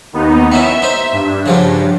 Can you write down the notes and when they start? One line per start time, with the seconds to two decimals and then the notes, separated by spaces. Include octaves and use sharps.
0.13 D#2 B3 D#4
0.52 B3 C#4 E4 E5
0.82 D#4 C5
1.12 G2
1.46 C#3 F3 F#3